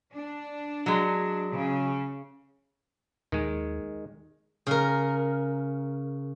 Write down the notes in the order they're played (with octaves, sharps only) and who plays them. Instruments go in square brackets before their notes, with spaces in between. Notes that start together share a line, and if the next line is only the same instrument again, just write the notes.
[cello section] D4
[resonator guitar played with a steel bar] F#3 G#3
[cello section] C#3
[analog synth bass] D#2 [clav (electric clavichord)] D#3 G#3
[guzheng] C#3 A#4